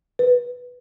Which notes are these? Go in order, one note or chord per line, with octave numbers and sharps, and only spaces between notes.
B4